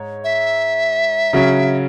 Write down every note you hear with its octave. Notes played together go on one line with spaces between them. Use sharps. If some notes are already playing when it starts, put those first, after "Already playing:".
Already playing: G#2 C#5
E5
C#3 F#3 C#4